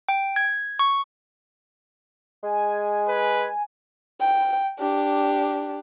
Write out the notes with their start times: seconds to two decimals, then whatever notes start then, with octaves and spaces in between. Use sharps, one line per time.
0.09 G5
0.36 G#6
0.79 C#6
2.43 G#3 G#5
3.08 B4
4.20 G5
4.79 D4 G4